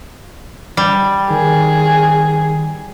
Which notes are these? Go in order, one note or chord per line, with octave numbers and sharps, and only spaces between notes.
G3
D#3 G#4